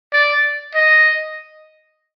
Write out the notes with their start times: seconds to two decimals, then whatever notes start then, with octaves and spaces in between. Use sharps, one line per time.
0.13 D5
0.75 D#5